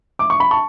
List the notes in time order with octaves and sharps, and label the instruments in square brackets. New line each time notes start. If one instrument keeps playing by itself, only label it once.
[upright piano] D6
C#6
B5
A5 C#6